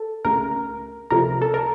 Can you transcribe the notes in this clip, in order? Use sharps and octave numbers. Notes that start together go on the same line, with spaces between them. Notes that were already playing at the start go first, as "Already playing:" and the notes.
Already playing: A4
C#2 C#3 A3 A#4
C#2 C3 F3 A3 A#4
A4
A#4